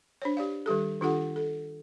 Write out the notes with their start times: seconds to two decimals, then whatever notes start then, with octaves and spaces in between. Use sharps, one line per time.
0.22 D4 C5 C#5
0.37 G4 D5 F5
0.66 D#3 G3 G4 A4
1.01 D#3 D4 F4 G4 A4 F#5
1.36 A4